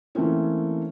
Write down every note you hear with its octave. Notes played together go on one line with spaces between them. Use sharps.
E3 A3 A#3 C4 C#4